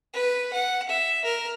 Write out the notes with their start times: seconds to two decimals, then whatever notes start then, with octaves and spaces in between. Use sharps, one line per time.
0.13 B4
0.53 F#5
0.89 E5
1.25 A#4